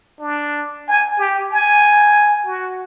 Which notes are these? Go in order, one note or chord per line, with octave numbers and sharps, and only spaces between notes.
D4
G#5
G4
G#5
F#4